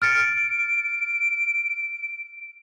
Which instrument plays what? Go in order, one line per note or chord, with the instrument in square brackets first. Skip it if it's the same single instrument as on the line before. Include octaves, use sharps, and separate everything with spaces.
[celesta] F6 A6 C#7 [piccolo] D7